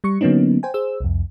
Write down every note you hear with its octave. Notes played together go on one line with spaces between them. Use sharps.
G3 C#6 C#7
D3 F#3 A#3 B3 C#4 D#4
C5 G5 G#5
G#4 C5 E6
C2 F2